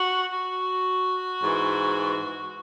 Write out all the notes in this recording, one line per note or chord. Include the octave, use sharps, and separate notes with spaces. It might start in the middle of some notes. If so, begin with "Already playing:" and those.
Already playing: F#4
F#4
G#2 E3